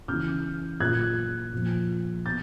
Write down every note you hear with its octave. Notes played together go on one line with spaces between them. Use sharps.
C#3 E3 F6 G6
A#2 F#3 F#6 G#6
A#2 F3
B2 G6 A6